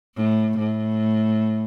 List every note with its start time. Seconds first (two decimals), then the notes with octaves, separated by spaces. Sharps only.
0.16 A2
0.58 A2